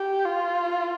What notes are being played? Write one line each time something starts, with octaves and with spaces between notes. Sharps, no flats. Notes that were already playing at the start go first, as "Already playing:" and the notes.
Already playing: G4
F4